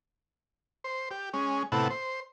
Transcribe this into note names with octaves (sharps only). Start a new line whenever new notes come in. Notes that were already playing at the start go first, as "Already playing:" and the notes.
C5
G4
G#3 C#4
A2 C3 B3 E4 F#5 A5
C5